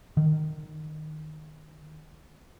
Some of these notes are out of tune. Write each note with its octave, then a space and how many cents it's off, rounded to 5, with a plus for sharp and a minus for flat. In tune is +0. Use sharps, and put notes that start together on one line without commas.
D#3 -15